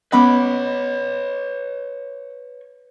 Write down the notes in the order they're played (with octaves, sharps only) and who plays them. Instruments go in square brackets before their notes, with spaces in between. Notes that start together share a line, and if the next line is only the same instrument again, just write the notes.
[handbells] B3 C#4 D#5 [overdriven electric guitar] B4 C#5 [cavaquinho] F#5 B5 D6